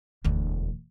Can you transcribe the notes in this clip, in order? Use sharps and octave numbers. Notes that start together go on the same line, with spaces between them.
E1 D2